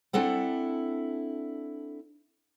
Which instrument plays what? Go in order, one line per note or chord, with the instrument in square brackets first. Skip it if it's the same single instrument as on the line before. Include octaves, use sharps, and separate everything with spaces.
[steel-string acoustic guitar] C4 D4 E4 A4 F#5